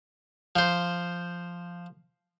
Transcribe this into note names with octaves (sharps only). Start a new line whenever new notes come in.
F3 C5